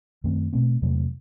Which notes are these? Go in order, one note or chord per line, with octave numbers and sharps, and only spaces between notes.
F#2 D#3 A3 C4
B2 A3 C4
E2 C3 F#3 A3